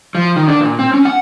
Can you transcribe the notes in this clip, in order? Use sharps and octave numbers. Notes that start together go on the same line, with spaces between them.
F3
D#3
D4
A#2
C4
C#4
F#5